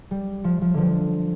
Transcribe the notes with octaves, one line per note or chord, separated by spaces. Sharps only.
G3
F3
F3
D3 F3